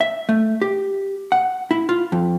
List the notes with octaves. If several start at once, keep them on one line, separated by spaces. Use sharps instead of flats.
E5
A3
G4
F#5
E4
F4
F2